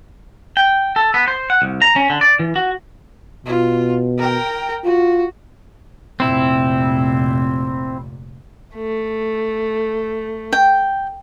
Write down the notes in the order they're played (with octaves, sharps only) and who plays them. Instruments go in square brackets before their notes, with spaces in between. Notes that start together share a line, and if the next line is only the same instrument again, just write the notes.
[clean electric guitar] G5
A4
B3
C5
F#5
C2
A#5
C#4
D3
D5
E3
F#4
[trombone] B2 [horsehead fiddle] F4
[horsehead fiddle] A#4 G5
[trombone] F4 [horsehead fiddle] F#4
[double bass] F1 A#2 [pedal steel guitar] C4 E4
[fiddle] A3
[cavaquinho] G5